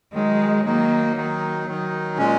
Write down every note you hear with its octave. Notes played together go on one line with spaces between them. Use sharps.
D#3 F#3 G#3 D#4
D#3 F#3 A#3 D#4
D#3 F#3 D#4
D#3 F#3 D#4
A#2 G#3 C#4